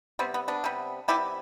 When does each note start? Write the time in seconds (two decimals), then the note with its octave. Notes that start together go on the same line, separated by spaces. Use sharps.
0.19 C3 G3 B3 C4
0.34 B3
0.48 B3 D4
0.64 C3 G3 B3
1.08 C3 G3 B3 E4 G4